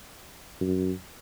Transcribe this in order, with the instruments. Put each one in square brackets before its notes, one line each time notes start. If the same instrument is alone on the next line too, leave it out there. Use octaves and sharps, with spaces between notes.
[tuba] F#2